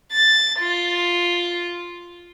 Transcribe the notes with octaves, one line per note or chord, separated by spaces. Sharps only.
A6
F4